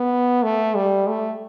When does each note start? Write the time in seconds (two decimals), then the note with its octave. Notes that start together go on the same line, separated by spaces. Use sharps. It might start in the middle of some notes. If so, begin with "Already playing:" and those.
Already playing: B3
0.43 A3
0.75 G3
1.07 A3